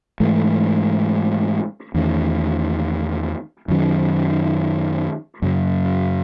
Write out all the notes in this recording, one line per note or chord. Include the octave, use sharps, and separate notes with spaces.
G#2 E3 A3
E2 D#3 A3 C#4
F#2 D#3 F#3 C#4
F#2 C#3 F#3